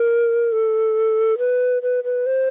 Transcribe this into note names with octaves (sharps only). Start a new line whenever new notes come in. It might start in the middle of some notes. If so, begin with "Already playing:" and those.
Already playing: A#4
A4
B4
B4
B4
C5